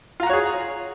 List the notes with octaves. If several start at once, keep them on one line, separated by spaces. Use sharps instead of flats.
F4 F#4 G#4 C#5 A#5